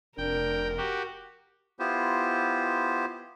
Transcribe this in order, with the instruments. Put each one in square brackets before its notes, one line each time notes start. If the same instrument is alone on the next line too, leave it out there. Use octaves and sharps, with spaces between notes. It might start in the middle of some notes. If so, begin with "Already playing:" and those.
[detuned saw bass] F1 [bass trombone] D4 [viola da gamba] A#4 [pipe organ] G5
[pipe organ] F#4 G4
[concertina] B3 E4 F4 G4 C5